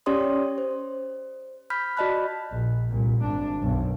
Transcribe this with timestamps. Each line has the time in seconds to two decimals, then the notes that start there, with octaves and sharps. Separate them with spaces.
0.06 C#4 G4 C#5 D5 C6 D#6
0.58 C5
1.70 B5 F6 G6 B6
1.97 F#4 D5 D#5 A5 B5 F#6
2.51 A#1
2.89 C2 A#2
3.23 G#1 D4
3.59 B1 F#2